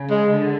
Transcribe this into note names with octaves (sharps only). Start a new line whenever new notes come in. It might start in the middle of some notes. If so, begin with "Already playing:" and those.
Already playing: C#3
G#3
D3